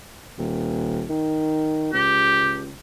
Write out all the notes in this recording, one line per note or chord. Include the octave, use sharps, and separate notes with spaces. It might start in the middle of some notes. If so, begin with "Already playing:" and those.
D#1
D#3
C#2 G4